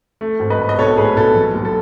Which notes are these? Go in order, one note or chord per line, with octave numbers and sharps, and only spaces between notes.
A3
G#1
B4 D#5
G#1
D#5
B1 A4 C#5
A2 G#4 B4
B1 A4
F#3
D#2
A4